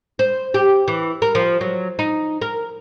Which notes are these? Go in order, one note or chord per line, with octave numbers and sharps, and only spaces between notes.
C5
G4
E3
A#4
F3
F#3
D#4
A#4